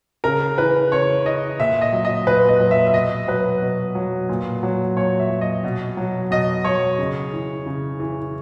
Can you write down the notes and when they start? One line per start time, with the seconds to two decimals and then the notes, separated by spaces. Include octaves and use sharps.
0.24 C#3 A#4
0.58 E3 B4
0.92 C#3 C#5
1.25 E3 D#5
1.59 A#2 E5
1.81 D#5
1.92 F#3
2.05 D#5
2.27 A#2 B4
2.49 D#5
2.60 F#3
2.71 E5
2.87 E5
2.94 B2 D#5
3.28 F#3 B4
3.62 B2
3.95 F#3
4.29 A#2
4.63 F#3
4.96 A#2 C#5
5.19 E5
5.30 F#3
5.41 D#5
5.64 B2
5.97 F#3
6.31 B2 D#5
6.65 F#3 C#5
6.98 C#3
7.33 E3
7.66 C#3
8.00 E3